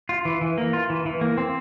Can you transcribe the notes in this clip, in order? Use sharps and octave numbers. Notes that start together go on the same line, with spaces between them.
F4
E3
E3
A#3
F4
E3
E3
A#3
C4